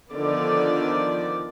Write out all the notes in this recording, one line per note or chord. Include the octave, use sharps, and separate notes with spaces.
D3 D#3 F3 B3 D5